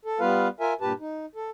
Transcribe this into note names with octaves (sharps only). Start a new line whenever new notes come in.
A4
G3 B3 F4 B4 F5
F4 A#4 E5 G#5
G2 A#2 G4 B4 A5
D#4
A4